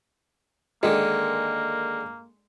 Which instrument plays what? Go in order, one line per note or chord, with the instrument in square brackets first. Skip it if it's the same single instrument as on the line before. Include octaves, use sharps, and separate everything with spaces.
[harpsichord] D3 D#3 [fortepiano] G#3 [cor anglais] A#3